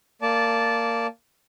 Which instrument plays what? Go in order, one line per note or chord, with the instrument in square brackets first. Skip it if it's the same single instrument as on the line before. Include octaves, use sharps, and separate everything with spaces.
[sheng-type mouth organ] A#3 D5 A5